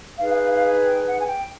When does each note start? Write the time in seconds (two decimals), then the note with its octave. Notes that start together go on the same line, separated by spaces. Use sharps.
0.18 D#4 G#4 B4 F5
0.34 F5
0.50 F5
0.84 G5
1.06 F#5
1.20 G#5
1.27 G5